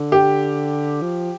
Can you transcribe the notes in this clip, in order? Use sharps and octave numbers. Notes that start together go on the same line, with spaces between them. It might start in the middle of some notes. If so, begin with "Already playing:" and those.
Already playing: D3
G4
F3